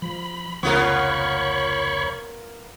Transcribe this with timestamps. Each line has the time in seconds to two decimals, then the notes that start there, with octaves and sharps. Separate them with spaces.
0.02 F3 B5
0.63 F1 C#2 B3 F4 A#4 C#5 B5 C#6